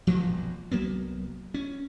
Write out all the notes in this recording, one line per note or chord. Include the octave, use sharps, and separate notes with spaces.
E1 A#1 F#2 F3
C2 F#3 A#3 B3
C#4